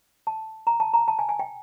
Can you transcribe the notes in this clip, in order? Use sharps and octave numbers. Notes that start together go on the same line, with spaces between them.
A5
A#5
A5
A#5
A5
G#5
G#5
G5